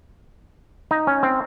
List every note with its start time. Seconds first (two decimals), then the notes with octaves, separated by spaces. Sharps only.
0.91 D#4
1.07 C#4
1.23 C4